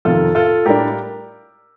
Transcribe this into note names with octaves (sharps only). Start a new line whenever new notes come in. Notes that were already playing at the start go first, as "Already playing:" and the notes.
F2 C3 D#3 F4 A4
F4 A4
A2 G3 D4 G4 A#4